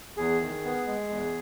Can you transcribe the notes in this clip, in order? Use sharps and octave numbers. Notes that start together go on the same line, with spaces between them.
E2 G#4
D#3
B3
G#3
E2